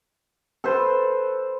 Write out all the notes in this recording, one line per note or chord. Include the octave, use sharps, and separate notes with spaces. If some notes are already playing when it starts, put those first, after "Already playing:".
A4 B4 C5